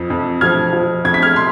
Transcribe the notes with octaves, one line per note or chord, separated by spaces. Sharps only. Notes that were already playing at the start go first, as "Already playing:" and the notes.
Already playing: F2 F3
F2
F3 F6 G#6
F3
F2 G#6
B6
F6 G#6
C6